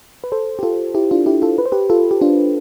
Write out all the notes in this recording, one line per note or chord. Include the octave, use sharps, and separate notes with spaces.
B4
A4 C5
G4
F4 A4
E4 G4
D4 F4
E4 G4
F4 A4
B4
C5
G4 B4
F4 A4
G4
D4 F4